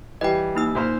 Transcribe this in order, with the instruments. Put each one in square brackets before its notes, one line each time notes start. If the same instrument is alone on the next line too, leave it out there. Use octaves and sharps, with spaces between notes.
[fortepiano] E3 G3 [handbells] D#5 G5
[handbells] A#3 D#4 E6
[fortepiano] A#2 C5 F6